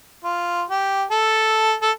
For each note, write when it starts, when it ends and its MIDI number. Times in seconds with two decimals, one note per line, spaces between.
0.24 0.63 65
0.70 1.03 67
1.11 1.74 69
1.82 1.91 69